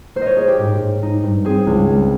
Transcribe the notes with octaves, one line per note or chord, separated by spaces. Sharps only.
A#3 C5
C#5 D#5
A#3 G#4
G4
G#2 G4
G#2
D#4
G2
C4 G#4
C#2
G#3